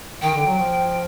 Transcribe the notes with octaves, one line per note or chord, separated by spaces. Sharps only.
D#3 G5
D3
F#3
F3